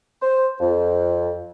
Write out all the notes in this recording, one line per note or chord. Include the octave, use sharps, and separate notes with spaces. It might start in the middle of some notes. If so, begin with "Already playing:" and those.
C5
F2